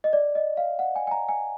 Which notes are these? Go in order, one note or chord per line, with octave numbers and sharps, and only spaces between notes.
D#5
D5
D#5
F5
F#5
G#5
G#5
A#5
G#5